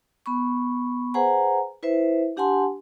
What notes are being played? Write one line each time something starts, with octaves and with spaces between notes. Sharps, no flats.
B3 B5 C#6
G#4 B4 C5 F#5 G#5 A#5
E4 B4 C5 E5
D4 G4 F#5 G#5 A5 C6